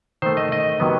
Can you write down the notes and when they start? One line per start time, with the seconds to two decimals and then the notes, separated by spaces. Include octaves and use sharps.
0.22 D#3 A3 C5
0.37 D#5
0.52 D#5
0.80 C3 D#3 F#3 B3